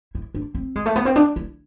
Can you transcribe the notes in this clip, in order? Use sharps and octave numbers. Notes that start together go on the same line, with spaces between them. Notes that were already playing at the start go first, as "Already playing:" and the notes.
E4
D4
C4
G#3
A3
B3
C4
D4
E4